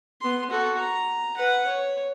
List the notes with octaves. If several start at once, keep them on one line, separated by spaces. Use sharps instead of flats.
B3 C6
F#4 A4
A#5
B4 F#5
C#5